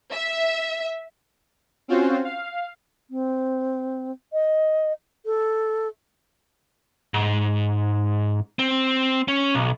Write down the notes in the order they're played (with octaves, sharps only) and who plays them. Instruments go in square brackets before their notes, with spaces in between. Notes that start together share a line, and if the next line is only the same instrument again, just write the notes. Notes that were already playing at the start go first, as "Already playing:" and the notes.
[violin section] E5
[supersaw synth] C4 C#4 F4 F#4 C5
F5
[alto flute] C4
D#5
A4
[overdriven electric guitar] G#2
C4
C#4
B1